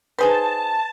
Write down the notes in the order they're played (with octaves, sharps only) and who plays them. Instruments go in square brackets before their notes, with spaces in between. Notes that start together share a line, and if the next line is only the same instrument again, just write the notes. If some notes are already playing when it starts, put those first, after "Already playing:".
[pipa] D#4 G#4 C5 [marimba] B4 [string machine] A5